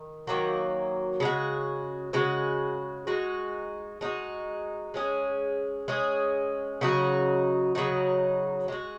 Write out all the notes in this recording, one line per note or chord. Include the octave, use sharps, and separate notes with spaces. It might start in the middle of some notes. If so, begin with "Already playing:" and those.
Already playing: D#3
D#3 F#3 A#3 F#4
C#3 G#3 F#4
C#3 G#3 F#4
G#3 D#4 F#4
G#3 D#4 F#4
G#3 C#4 G#4
G#3 C#4 G#4
C#3 F#3 D#4 F#4
C#3 F#3 D#4 F#4
G#3 F#4